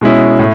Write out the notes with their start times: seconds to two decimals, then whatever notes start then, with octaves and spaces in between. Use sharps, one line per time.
0.01 B2 G#3 C#4 E4
0.39 A2